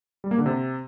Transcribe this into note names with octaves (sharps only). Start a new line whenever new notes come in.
G3
A#3
D3
C3